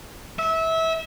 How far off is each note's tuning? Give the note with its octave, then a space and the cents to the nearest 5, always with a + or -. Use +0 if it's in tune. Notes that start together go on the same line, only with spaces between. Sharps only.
E5 -25